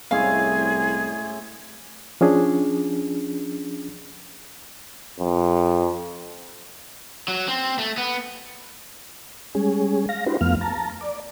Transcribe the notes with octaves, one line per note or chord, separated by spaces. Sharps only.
C2 A2 G#3 C#4 G#4 F5
F3 C#4 D4 G#4
F2
F#3
C4
A3
B3
G3 G#3 C#4 G#4
F5 A#6
D4 E4 F#4 G4 B4 C5
F2 F3 A3 B3 F5 F6
A5 A#5
D5